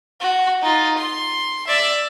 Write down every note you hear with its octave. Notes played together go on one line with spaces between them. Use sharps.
F#4
D#4 F4
C6
D5 E5